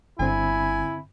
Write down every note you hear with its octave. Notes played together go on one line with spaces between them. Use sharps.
G1 D3 C4 E4 G#5